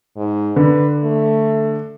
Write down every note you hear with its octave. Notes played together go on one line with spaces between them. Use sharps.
G#2
D3 B4
A3